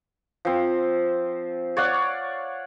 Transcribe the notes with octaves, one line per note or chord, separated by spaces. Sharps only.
F3 C4
C#5 D5 F5 F#5